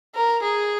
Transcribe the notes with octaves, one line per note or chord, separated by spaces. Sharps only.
A#4
G#4